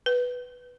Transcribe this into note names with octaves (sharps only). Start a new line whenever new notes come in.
B4